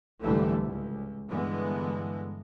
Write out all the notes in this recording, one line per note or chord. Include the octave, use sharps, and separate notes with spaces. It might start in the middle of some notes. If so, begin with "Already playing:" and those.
C2 G#2 D3 E3 G3 A3
C#2
G2 D3 E3 G#3 B3